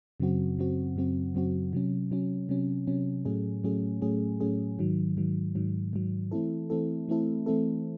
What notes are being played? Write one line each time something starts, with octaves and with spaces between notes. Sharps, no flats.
F#2 C#3 F#3 C4 F#4
F#2 C#3 F#3 C4 F#4
F#2 C#3 F#3 C4 F#4
F#2 C#3 F#3 C4 F#4
C3 F#3 C#4
C3 F#3 C#4
C3 F#3 C#4
C3 F#3 C#4
A2 F#3 A3 C#4 G#4
A2 F#3 A3 C#4 G#4
A2 F#3 A3 C#4 G#4
A2 F#3 A3 C#4 G#4
G#2 D#3 F#3
G#2 D#3 F#3
G#2 D#3 F#3
G#2 D#3 F#3
E3 A3 C4 E4 A4
E3 A3 C4 E4 A4
E3 A3 C4 E4 A4
E3 A3 C4 E4 A4